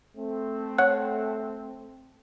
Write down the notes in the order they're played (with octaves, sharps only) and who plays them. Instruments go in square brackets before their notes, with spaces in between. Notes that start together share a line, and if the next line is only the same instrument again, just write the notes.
[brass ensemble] A3 C4
[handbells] C#5 F#5 F#6